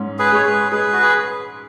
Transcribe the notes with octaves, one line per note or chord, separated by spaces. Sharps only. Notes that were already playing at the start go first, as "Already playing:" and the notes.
Already playing: G#2 C#4
G#4 B4
G#3 C#5
G#4 B4
G#3 G#4 B4
F#4
G#4